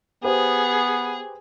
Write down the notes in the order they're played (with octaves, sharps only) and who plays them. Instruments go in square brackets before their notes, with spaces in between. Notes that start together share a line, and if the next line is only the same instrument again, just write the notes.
[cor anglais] B3 [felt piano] G4 B4 C5 [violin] G#4